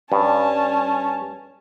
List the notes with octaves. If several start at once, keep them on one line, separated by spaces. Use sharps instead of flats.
G2 C#4 A5